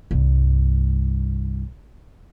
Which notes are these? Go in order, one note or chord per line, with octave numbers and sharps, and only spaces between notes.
C2 G2